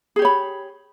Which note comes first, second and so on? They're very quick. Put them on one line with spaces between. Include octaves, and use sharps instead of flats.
G#4 G4 C#5 B5